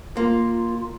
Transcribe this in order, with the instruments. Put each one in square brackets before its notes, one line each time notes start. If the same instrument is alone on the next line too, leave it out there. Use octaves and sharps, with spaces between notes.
[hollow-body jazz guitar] A#3 [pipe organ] F4